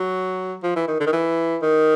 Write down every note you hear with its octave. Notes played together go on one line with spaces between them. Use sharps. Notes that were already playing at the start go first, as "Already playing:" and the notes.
Already playing: F#3
F3
E3
D#3
D3
D#3
E3
D#3